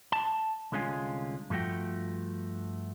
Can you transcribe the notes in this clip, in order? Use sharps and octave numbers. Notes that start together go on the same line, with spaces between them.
A5
C2 D3 G#3 C#4 F4 G#5
G2 F3 A3 F#4 G5